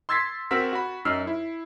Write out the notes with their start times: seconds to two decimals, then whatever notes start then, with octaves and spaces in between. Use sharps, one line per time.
0.09 C6 E6 G#6 A6 B6 C7
0.51 C4 F#4 A#4 E6 B6
0.73 F#4 B5
1.05 F#2 D#4 E6 F6 C7
1.27 E4